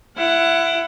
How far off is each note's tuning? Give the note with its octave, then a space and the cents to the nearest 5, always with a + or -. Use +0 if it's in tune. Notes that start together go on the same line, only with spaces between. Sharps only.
E4 +20 F#5 +0